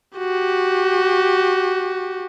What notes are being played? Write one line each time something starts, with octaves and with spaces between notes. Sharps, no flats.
F#4 G4